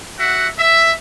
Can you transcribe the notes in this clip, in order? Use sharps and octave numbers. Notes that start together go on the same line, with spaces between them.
F#4 E5 F#5
E5